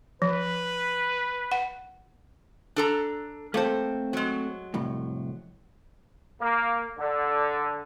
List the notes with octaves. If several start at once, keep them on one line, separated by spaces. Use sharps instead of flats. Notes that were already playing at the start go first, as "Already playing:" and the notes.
F3 B4
F#5
D4 A4 A#5
A3 A#3 C4 A4 C5
F#3 G#3
C2 F2 A2
A#3
D3